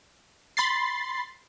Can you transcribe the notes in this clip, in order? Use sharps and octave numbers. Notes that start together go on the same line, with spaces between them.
B5 C6 A6 C7